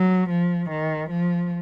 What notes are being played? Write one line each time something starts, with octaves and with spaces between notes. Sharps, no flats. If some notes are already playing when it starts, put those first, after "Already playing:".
Already playing: F#3
F3
D#3
F3